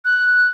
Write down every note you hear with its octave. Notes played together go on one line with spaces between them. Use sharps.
F#6